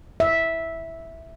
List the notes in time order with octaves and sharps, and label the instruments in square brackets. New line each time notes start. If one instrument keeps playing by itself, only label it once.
[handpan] E5